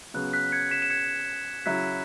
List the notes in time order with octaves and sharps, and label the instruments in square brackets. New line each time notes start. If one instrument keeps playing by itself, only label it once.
[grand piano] C#3 F#3 B3 [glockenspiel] F#6
[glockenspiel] F#6 B6
G#6 C#7
B6 E7
E7
G#6 C#7
[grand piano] C#3 F#3 E4 [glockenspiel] F#6 B6